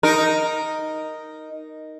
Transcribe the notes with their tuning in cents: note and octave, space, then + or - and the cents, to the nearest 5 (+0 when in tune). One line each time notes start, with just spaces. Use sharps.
D#4 +0 A#4 +0